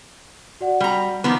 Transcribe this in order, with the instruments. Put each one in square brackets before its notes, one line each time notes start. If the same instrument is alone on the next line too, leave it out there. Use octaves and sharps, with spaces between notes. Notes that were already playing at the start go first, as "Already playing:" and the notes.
[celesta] F#4 D5 F#5
[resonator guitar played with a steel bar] G3 A#5
[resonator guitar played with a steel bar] D#3 F3 B3 [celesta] A#5 D6